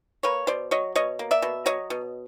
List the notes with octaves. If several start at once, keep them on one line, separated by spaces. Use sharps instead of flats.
A#3 B4 C#5
B2 C5 D5
F#3 C#5 D#5
B2 C#5 D#5
A#3
D5 E5
B2
F#3 C#5 D#5
B2